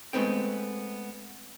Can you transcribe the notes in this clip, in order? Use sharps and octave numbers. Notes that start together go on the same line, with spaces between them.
G#3 A3 B3 C4 G5